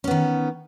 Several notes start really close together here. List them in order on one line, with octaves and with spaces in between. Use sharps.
C#4 B3 D#3